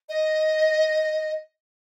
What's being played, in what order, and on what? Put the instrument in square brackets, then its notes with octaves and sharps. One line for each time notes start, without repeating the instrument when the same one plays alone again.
[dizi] D#5